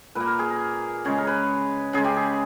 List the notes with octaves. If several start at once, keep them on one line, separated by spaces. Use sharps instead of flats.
A#2 A#3 B4
A#4
G#4
A#4
C#3 G#3 C#5
A#4
B4
C#3 G#3 G#4
G4
G#4